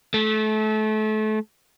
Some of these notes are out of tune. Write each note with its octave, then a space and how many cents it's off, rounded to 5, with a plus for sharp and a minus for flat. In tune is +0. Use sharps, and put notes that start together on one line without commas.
A3 -30